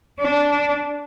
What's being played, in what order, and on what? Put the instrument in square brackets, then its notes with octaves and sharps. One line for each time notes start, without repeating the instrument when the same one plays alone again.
[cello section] D4